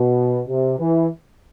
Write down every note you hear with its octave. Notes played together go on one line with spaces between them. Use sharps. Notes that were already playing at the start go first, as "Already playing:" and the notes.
Already playing: B2
C3
E3